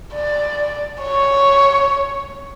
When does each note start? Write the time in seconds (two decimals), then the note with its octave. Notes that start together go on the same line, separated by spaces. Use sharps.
0.15 D5
1.03 C#5